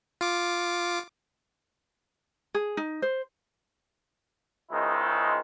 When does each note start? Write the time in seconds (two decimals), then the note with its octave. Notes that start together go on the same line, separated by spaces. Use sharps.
0.21 F4 D6
2.55 G#4
2.77 D#4
3.02 C5
4.70 C#2 D#3 G#3 E4 C5